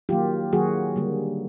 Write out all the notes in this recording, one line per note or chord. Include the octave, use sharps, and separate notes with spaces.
D#3 F#3 A#3 F4 G4
D#3 F#3 A#3 F#4 G#4
D3 G3 A#3